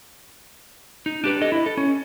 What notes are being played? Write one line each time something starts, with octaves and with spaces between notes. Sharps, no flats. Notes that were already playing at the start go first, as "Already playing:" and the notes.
D#4
D4 G4 B4
A4 D#5
E4
A4
C#4